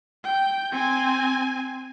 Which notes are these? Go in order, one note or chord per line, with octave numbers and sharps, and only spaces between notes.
G5
C4 G#5